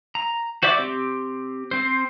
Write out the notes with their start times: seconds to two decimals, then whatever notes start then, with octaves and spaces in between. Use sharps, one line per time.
0.15 A#5
0.63 F#4 C5 D5 E5 D6
0.78 C4 G4
1.71 C4 C5